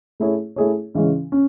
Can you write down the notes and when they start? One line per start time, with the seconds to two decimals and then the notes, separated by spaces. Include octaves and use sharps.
0.20 A3 E4 G#4 C#5
0.56 A3 E4 G#4 C#5
0.95 C#3 E3 G#3 C#4
1.32 C#4